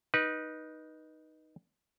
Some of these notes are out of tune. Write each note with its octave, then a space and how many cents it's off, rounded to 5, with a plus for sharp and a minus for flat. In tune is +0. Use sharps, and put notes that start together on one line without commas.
D#4 +0 B4 -25